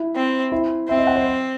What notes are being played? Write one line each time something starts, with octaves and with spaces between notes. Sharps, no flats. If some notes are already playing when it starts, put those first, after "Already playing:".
Already playing: E4
C4
E4
C4 E5
D#5
F#5
C5